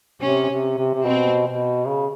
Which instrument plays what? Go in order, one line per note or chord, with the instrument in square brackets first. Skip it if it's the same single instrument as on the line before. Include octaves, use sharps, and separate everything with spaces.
[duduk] C3 [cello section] C#4
[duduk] C3
C3
C3
[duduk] B2 [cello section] C4
[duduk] B2
C#3